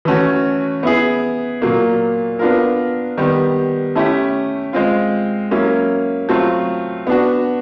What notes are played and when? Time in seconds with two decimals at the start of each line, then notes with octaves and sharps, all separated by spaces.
0.05 E3 A3 C#4 F#4
0.83 B3 E4 G#4
1.62 A#2 F#3 A#3
2.39 B3 D4 F4 A#4
3.17 D#3 G3 B3
3.95 A3 C#4 E4 G4
4.73 G#3 C4 F4
5.51 F#3 A#3 C#4 E4
6.29 F#3 A3 C4 F4
7.07 B3 D4 F#4